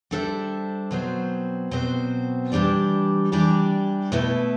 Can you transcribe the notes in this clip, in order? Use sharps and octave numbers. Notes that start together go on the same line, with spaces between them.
G3 D4 A4 C5 E5
B2 F#3 C4 F#4 C5
B2 F#3 C4 F#4 C5
E3 G3 D4 G4 D5
E3 G3 D4 G4 D5
B2 A3 E4 B4